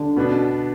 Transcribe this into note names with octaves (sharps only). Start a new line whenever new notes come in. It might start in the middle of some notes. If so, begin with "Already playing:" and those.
Already playing: D3 G3
B2 B3 D4